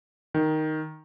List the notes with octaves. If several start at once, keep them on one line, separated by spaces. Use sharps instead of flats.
D#3